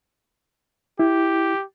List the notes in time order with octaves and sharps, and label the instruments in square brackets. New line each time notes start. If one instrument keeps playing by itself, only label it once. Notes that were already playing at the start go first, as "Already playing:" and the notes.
[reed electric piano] E4 [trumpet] G4